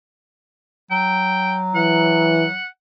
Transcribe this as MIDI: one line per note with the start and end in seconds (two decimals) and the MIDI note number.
0.91 2.58 54
0.91 1.57 79
1.75 2.45 52
1.75 2.66 78